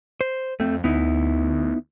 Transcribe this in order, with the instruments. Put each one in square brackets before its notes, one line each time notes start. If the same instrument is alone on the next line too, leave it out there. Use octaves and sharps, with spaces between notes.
[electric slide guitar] C5
[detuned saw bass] F2 [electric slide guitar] A3 C4
[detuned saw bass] D2 [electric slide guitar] B3 D#4 E4